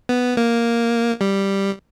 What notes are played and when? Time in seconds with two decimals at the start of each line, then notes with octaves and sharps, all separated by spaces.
0.09 B3
0.37 A#3
1.21 G3